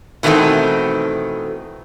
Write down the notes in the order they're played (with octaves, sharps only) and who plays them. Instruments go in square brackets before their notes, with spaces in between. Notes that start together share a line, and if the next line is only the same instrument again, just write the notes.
[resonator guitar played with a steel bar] B2 D#3 E3 A3 C4 A4